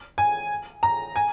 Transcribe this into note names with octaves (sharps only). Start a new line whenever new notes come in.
G#5
A#5
G#5